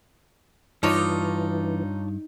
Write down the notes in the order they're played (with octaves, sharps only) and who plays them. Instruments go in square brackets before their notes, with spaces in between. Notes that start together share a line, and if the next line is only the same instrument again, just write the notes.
[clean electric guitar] G2 [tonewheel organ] E3 [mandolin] D4 F4 C#5 [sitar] D#4